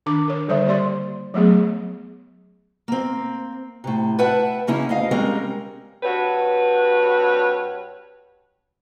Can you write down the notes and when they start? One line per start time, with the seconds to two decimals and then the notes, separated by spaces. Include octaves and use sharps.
0.06 D#3 D4 D6
0.28 A#4 C#5
0.48 D3 G3 C5 E5
0.66 A#3 G4 D5 C6
1.34 F#3 A3 B3 G#4
2.88 A#3 C4
3.84 A2 C3
4.19 B4 E5 F#5 G5 A5
4.67 C#3 A#3 C#4 E4
4.89 D2 D#5 F5
5.11 G3 G#3 C4 C#4 A#4
6.03 G2 C4 F#4 B4 C#5